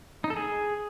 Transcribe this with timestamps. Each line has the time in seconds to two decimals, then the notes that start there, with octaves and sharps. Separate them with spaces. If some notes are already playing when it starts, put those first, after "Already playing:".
0.24 D#4
0.30 A4
0.36 G#4